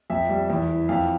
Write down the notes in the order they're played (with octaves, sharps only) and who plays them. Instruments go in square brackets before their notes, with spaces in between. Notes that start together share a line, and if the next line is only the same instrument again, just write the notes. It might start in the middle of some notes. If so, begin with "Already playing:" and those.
[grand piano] F2 E5
G3
E2
E3
F2 F5